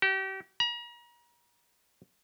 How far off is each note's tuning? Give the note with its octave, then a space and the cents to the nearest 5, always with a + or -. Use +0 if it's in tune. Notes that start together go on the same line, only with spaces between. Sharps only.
G4 -35
A#5 +40